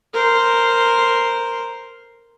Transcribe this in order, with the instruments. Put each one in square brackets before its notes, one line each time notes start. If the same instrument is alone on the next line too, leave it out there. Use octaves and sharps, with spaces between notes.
[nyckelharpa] A#4 C5